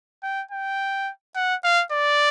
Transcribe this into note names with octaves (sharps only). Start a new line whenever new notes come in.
G5
G5
F#5
F5
D5